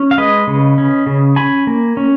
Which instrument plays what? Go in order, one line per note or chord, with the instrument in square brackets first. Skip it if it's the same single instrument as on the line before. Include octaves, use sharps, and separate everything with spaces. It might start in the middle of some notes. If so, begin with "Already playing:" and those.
Already playing: [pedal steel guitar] C#4
F5
G#3 B4 D#5
C#3
C#4
C#3
C#4 G#5 B5
A#3
C#4